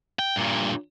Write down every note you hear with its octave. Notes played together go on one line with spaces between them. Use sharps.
G5
G2 A#2